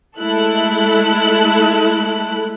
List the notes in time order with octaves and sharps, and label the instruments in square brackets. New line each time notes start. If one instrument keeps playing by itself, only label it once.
[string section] G#3 A3 E4 A4 F#6